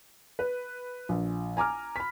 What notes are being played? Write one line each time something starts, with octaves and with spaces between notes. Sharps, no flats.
B4
A#1
G#5 A#5 D6 F6
B5 B6